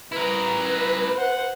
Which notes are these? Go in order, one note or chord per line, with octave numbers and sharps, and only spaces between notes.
E4 A#4 B4
C5 F#5